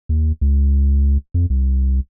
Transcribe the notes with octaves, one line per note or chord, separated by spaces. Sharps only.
D#2
C#2
F2
C2